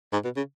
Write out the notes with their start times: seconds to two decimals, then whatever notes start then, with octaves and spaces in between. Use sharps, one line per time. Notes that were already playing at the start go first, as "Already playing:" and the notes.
0.13 G#2
0.24 B2
0.37 C#3